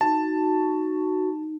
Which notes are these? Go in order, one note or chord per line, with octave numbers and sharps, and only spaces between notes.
D#4 F#4 A5